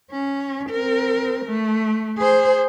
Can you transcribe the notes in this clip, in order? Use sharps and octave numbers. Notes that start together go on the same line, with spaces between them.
C#4
C4 A#4
A3
G#4 C5